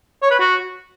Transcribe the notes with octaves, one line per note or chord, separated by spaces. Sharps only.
C#5
B4
F#4